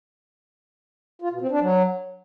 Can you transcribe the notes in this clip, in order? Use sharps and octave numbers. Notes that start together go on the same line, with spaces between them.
F4
B2
C4
D4
F#3